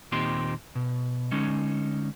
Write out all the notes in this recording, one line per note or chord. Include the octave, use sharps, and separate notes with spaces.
D#2 A#2 C4 D#4 G4 C6
B2
D3 G#3 C#4 D#4